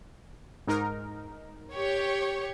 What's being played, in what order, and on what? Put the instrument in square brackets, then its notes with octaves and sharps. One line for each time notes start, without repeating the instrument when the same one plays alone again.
[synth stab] G#2 D#4 A#4
[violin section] G4 C#5